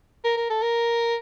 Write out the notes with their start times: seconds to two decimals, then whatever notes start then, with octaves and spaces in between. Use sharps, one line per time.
0.24 A#4
0.37 A#4
0.50 A4
0.62 A#4